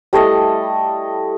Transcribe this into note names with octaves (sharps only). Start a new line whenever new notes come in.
G3 A3 E4 D#5